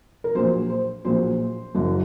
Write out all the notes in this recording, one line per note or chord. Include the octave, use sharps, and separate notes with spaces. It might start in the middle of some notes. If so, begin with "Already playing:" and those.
A#4
A#1 A#2 F#3 C5
C5
A#1 A#2 F#3 C5
F#1 F#2 F#3